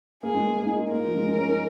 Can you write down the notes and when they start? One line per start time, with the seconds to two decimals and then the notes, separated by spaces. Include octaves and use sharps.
0.23 A#3 G#4
0.35 G#3
0.46 A#3
0.57 A#3
0.66 D#4
0.75 F4
0.83 D#4
0.92 A#3 A#4
1.07 F3
1.15 G#3
1.26 G#3
1.38 C#4
1.49 D#4